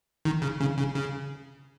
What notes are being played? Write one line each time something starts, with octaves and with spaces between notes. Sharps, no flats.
D#3
C#3
C#3
C#3
C#3